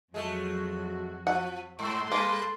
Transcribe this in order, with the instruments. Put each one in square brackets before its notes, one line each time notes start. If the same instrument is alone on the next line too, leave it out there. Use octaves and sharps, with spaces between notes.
[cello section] F2 F#3 F#4 [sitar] G#3 A3
[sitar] F3 [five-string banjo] F#5
[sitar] G#2 [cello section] G#3 A3 [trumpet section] C6
[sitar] G3 B4 [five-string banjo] A#3 [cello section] A4